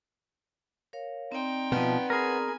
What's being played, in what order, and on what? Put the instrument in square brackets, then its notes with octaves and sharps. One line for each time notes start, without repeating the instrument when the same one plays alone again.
[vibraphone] A#4 C#5 F5
[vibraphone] C4 D5 C6 [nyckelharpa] D#4 G5
[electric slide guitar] B2 F3 [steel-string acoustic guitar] B3
[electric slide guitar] G#4 A#4 [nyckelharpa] G#5 B5